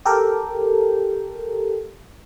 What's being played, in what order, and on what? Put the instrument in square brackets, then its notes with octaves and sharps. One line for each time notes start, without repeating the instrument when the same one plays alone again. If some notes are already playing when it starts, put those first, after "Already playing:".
[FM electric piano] G4 A4 A#4 G5